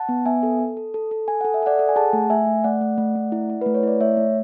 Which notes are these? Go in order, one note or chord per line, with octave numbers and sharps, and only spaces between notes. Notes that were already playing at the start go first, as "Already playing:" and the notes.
Already playing: F#5 A5
B3
B3 E5 G#5
A4
A4
A4
A4
A4
A4 G#5
A4 F#5
E5
A4 D5 F#5
A4
G#5
G#4 F#5 A5
A3
A3 E5 G#5
A3
A3 D5 F#5
A3
A3
A3
E4
E4
A3 B4
C#5
E4 D5
A3 C#5 E5
A3